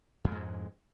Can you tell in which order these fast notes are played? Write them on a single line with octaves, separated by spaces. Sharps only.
F2 G#3 G#2